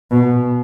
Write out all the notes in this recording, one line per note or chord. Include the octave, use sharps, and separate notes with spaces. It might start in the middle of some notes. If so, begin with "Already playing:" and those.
B2